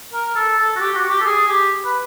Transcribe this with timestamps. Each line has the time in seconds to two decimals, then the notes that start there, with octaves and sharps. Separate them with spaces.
0.13 A#4
0.35 A4
0.58 A4
0.76 F#4
0.80 G4
0.95 F#4
1.09 G4
1.20 A4
1.25 G#4
1.48 G4
1.85 B4